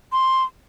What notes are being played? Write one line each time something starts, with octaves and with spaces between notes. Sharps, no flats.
C6